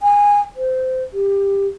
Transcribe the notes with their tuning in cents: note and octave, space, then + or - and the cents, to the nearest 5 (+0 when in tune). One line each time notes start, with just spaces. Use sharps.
G#5 -20
C5 -20
G4 +15